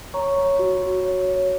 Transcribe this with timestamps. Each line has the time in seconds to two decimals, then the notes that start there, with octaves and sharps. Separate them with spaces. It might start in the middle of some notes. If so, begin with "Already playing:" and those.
0.14 C#5 A#5 C#6
0.36 C#5
0.59 F#4
0.82 F#4
1.05 C#5
1.28 C#5